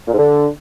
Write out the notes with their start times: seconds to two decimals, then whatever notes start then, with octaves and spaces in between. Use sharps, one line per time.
0.07 A#2
0.13 G#2
0.18 D3